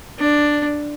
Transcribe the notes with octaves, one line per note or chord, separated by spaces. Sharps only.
D4